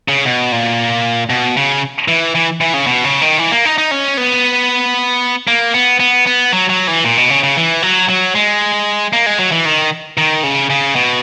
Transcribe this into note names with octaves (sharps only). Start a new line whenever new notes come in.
C#3
B2
A#2
B2
C#3
E3
E3
E3
C#3
B2
C#3
D#3
E3
A#3
D#4
D#4
C#4
B3
A#3
B3
B3
B3
F#3
F#3
E3
A#2
B2
C#3
C#3
E3
F#3
F#3
G#3
A#3
G#3
F#3
E3
D#3
D#3
C#3
C#3
B2